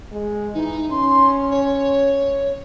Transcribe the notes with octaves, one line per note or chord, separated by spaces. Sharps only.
G#3
E3 D#4
C#4 C6
C#5